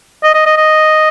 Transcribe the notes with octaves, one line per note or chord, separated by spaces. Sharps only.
D#5
D#5
D#5
D#5